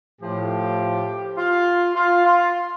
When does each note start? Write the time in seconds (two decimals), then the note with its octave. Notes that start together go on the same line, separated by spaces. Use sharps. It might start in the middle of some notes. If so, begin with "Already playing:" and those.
0.21 A2 F3 G4
1.37 F4
1.95 F4
2.25 F4